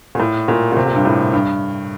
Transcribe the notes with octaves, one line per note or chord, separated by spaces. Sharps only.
A#2
A2
A#2
A#2
C3
A#2
G2
A2
G2